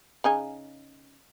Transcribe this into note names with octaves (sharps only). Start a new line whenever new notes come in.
C#3 D#4 G#5